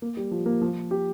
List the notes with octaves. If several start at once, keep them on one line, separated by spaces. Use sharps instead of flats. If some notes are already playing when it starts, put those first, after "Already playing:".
A#3
G3
F3
A#3
F3
G4